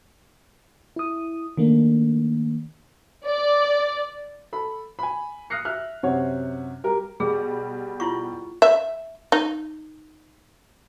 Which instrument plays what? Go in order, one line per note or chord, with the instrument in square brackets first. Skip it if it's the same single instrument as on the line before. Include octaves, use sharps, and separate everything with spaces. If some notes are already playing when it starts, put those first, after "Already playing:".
[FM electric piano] E4 D#6
D#3 A3 A#3 D4
[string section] D5
[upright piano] A4 B5
G#5 B5
D#6 F6 F#6 A#6 C7 C#7
E5 F6 F#6
F#2 C3 C4 C#5 F#5
G3 G4 A#4
[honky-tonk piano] B2 G3 [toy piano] G#4
[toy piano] E4 F4 C#6
[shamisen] E5
D#4